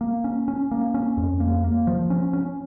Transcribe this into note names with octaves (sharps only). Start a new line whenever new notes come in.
A#3
C#4
C#4
A#3
C#4
F2
A#3
A#3
F3
C#4
C#4